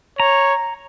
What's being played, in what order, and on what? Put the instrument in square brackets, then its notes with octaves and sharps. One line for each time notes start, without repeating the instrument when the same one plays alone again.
[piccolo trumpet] C#5 [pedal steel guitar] A#5